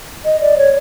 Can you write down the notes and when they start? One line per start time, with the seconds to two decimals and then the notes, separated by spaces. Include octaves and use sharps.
0.24 D#5
0.41 D5
0.57 C#5